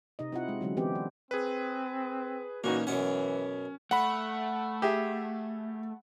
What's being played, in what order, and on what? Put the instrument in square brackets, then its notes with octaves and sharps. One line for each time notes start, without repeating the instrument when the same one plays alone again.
[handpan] C3 D#4 D#5
C4 E4 F4 F#5
G#3
D3 F#3 G#3 C#4
E3 B3 C4 G4
D4
[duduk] C4 [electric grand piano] G#4 B4
[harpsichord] A#2 E3 [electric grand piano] A#3 C#4 D#4 [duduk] F#4
[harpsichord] F#2 B2 F#5 [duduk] E3 [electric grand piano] C#4
[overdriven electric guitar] A3 [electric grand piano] F#5 B5
[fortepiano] G4 G#4 E5